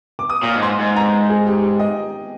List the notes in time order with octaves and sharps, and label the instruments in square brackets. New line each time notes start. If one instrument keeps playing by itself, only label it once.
[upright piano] D6
D#6
[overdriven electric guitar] A#2
G#2
[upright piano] C6
[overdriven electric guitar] G#2
[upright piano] A#5
G#4
G4
D#5